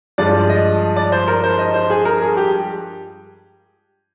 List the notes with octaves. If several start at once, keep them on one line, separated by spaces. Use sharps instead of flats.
G2 F3 G#3 D5
D#5
D5
C5
A#4
C5
D#5
C5
G#4
A#4
G#4
G4